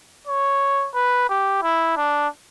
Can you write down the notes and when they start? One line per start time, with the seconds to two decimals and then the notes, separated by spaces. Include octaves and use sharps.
0.27 C#5
0.94 B4
1.29 G4
1.63 E4
1.97 D4